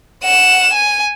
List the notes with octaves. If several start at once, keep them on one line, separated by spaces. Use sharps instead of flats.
F#5 E7
G#5